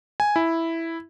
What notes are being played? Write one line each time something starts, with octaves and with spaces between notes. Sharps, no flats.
G#5
E4